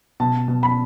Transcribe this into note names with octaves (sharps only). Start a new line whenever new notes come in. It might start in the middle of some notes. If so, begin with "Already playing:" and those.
B2 A5
B2
B5